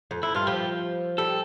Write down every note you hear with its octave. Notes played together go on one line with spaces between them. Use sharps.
F2
F2 E4
G2 F4
F3 G4
G3 A4